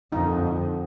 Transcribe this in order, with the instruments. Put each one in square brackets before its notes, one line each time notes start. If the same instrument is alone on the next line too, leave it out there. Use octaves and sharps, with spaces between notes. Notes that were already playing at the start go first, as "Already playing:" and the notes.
[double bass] F2 D3 [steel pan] D#4